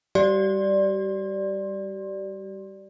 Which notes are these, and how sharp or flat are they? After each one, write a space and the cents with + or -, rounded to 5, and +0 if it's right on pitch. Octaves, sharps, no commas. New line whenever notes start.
G3 +0 G4 -35 D5 +0